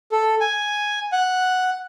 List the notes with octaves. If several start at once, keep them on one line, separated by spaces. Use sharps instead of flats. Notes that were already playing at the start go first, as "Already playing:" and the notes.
A4
G#5
F#5